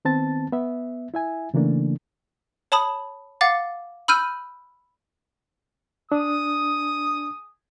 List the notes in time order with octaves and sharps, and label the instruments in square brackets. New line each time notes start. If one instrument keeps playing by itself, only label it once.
[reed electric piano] D#3 B3 C4 A5 A6
B3 E5
E4 E5 G#5
C#3 E3 A3 A#3 D4
[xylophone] C#5 A5 B5 D#6
F5 F#5 D6 A6
B5 E6 F6 G6 D#7
[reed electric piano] D4 [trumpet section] G#4 D#6